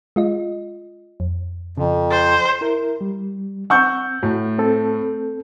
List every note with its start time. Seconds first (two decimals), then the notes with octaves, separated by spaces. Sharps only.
0.16 G#3 F4 D#5
1.20 F2
1.78 F2 C#3
2.11 C5 A6
2.61 E4 A#4
3.01 G3
3.70 C4 F#5 C#6 E6 G6
4.23 A2 F#4
4.58 C4 A4